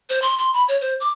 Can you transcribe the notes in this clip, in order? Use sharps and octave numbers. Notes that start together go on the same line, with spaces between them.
C5
C6
C6
B5
C#5
C5
D6